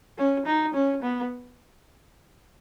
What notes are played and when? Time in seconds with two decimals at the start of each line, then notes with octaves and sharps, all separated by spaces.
0.18 C#4
0.46 D#4
0.74 C#4
1.02 B3